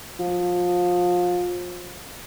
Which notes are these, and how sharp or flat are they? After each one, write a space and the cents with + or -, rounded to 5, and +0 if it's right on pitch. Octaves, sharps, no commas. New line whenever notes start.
F3 +25